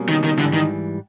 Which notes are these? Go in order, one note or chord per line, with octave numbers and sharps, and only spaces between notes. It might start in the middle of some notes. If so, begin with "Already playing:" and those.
Already playing: B2 G3 A#3 C#4
D#3
D#3
G#2 D3 E3 G3
D#3